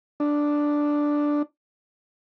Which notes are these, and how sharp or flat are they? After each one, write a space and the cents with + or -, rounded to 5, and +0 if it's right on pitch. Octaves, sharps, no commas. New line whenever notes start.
D4 +0